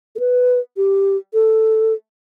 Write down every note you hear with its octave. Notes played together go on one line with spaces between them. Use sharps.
A4
B4
G4
A4